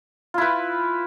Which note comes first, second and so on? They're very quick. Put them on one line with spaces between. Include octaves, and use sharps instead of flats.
F4 E4 B4